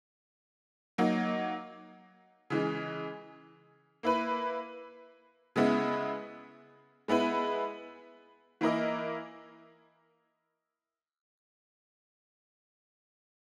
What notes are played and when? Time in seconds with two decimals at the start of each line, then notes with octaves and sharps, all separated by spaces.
0.98 F#3 A#3 D#4
2.50 C#3 E3 G#3
4.03 A#3 E4 B4
5.56 C#3 G#3 B3 E4
7.08 G#3 B3 E4 B4
8.61 E3 A#3 E4 A#4 D#5